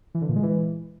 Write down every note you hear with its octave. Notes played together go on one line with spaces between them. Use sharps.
E3
D3
A#2
G#3
E3